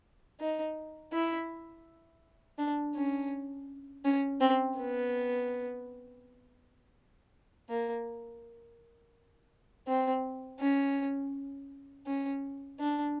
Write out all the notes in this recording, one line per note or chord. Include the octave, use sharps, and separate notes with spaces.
D#4
E4
D4
C#4
C#4
C4
B3
A#3
C4
C#4
C#4
D4